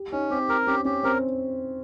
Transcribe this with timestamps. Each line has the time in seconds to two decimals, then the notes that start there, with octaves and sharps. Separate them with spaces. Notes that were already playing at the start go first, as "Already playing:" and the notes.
Already playing: G4
0.12 C#4 D#4
0.30 C4 G4
0.49 C4 A#4
0.67 C#4 G4
0.85 C#4 G4
1.04 C4 A#4